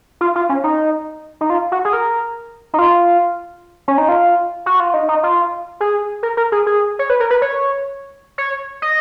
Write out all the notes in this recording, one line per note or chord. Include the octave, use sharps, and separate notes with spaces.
F4
F4
C#4
D#4
D#4
F4
F#4
G#4
A#4
D#4
F4
C#4
D#4
F4
F#4
F4
D#4
D#4
F4
G#4
A#4
A#4
G#4
G#4
C#5
B4
A#4
B4
C#5
C#5
D#5